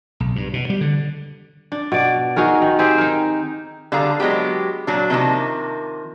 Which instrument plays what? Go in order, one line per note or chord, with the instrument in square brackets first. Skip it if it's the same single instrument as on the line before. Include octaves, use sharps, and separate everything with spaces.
[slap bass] B1
G2
B2
G3
D3
[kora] D4
B2 D5
D#4 F#4 G#4 A#4
D#3
C4 G4 G#4 C5
D#4 A#4
[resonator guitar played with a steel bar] D3 G3 G#4 F5 A#5
F#3 G#3 B3 G4
A#2 F#3 D4
C3 D#3 F3 A#3